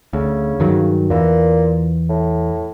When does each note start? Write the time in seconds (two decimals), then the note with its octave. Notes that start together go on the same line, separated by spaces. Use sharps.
0.13 D2 C#3
0.60 G2 D#3 F#3
1.10 E2 A#2 E3
2.09 A2